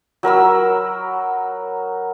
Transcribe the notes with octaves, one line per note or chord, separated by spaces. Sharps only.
F#3 A#4 B5 E6